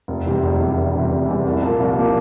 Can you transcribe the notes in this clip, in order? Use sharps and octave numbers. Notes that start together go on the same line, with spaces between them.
F1
E2 C3 E3 G3
F1
E2 C3 E3 G3
F1
E2 C3 E3 G3
F1
E2 C3 E3 G3
C2
A#2 F3 A#3
C2
A#2 F3 A#3